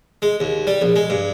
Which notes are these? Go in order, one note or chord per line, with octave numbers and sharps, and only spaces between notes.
G#3
D#2
G3
A#1
G#3
G2